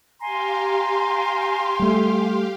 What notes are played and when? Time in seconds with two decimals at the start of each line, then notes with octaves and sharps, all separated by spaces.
0.21 G4 F5 G#5 A#5 C6
1.79 G3 A3